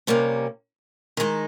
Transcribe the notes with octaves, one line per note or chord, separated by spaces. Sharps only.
C3 G3 A#3 C#4
D#3 G#3 D#4